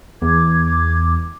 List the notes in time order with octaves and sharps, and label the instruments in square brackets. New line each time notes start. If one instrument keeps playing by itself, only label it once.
[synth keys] E2 [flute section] D6 G#6